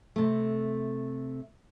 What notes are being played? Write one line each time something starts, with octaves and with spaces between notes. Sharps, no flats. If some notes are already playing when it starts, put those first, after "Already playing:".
C3 A3